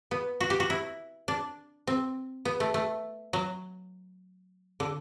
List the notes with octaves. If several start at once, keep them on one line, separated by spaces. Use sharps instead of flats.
B3
F#4
G4
F#4
E4
D4
C4
B3
A3
A3
F#3
D3